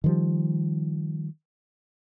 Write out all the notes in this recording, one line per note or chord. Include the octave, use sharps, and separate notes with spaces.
D#3 F3 G3